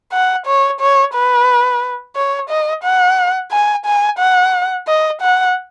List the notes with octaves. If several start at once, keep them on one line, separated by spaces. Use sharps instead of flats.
F#5
C#5
C#5
B4
C#5
D#5
F#5
G#5
G#5
F#5
D#5
F#5